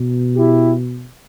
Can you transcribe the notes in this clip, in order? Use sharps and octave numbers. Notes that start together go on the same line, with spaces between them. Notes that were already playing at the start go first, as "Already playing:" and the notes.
Already playing: B2
E4 G4